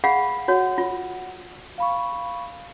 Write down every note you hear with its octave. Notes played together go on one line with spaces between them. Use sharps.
G#4 F5 F#5 B5
F#4 C#5 F#5
F4
F5 B5 C#6